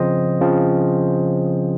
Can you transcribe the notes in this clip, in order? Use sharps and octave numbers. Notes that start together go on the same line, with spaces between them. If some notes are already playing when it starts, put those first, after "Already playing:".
Already playing: C#3 F3 C4 C5 D#5
C#3 F3 C4